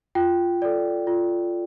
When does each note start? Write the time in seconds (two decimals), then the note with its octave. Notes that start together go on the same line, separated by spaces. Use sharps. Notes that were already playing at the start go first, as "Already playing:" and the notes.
0.15 F4 G5
0.62 A4 D5
1.07 F4